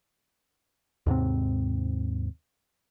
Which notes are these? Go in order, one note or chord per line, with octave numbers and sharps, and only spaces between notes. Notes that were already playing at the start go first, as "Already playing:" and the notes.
D#2 G#2 C3 C4